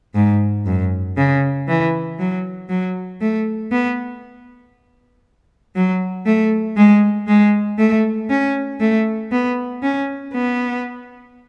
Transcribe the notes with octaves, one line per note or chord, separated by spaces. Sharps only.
G#2
F#2
C#3
E3
F#3
F#3
A3
B3
F#3
A3
G#3
G#3
A3
C#4
A3
B3
C#4
B3